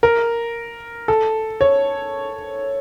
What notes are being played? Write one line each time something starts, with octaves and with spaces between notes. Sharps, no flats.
A#4
A4
C#5